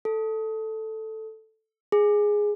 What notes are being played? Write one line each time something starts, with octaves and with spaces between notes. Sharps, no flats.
A4
G#4